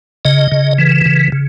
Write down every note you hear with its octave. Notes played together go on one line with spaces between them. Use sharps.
C#3 D#5
C#3
E3
C#3
C#3